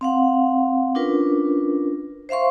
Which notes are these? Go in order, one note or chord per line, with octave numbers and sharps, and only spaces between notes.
C4 F5 F#5
C#4 D4 F4 A#4 B4
C5 E5 F5 C6 C#6